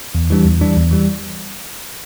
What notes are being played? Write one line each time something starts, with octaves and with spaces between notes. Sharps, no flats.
E2
E3 G3 D4
E2
E3 G3 D4
E2
E3 G3